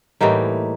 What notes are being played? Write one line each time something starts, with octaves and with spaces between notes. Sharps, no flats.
A2 E3 G3 A#3 D#4